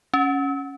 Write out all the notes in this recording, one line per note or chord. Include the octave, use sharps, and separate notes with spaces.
C#4